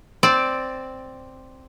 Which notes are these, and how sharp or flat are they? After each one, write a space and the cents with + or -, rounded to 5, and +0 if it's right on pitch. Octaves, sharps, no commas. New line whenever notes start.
C4 +0 D5 +0